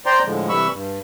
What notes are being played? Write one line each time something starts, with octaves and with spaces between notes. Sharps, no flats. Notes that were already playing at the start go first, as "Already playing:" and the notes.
C5 D5 G5 A#5 C6
A2 D3 F3 G#3
C3 E3 G3 B5 C#6 E6
G2